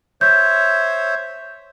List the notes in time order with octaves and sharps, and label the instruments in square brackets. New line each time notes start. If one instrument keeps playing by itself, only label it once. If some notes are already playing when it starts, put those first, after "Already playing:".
[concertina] C5 C#5 E5 [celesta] G6